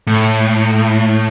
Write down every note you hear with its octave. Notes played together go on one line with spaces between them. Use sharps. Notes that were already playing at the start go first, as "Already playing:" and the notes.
A2